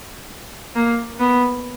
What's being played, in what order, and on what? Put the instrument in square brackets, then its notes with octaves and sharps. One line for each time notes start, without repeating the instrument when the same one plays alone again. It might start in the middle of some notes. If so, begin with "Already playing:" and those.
[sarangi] A#3
B3